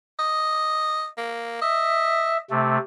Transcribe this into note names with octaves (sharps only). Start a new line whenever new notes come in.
D#5
A#3
D#5 E5
C3 A3